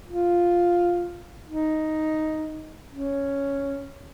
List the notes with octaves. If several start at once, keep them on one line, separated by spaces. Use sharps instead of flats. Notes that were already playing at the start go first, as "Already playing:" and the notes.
F4
D#4
C#4